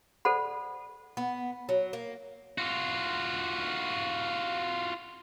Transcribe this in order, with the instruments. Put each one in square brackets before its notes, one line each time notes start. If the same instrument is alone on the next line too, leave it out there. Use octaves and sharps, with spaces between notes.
[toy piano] A4 C5 D5 F#5 B5
[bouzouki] B3
F#3
A#3
[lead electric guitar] F4 F#4